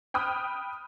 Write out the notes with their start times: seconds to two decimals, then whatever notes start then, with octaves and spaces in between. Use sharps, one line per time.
0.14 G5 B5 D#6 F6 F#6